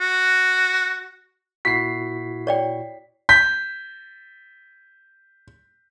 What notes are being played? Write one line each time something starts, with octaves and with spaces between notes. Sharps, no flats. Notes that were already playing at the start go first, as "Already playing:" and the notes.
F#4
A#2 E4 F#4 B6 C7
C#5 D5 G5
G6 B6